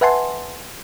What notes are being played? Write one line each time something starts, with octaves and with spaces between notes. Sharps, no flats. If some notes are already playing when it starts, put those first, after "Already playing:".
B4 E5 F#5 G#5 A5 C6